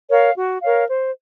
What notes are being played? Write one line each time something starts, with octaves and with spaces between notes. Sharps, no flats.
A#4 C#5 F5
F#4
A#4 C#5 F5
C5